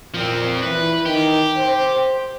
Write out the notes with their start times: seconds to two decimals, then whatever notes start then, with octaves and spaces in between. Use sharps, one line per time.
0.14 A#2 F3 C4
0.63 E3 B4
1.06 D#3 G4
1.58 C5